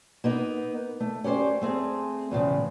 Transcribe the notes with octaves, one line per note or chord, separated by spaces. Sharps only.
A#3 B3 D#4
A3
C#4 G4 A#4 C5 D5
A3 C4 G#4
E2 A2 C#3 F3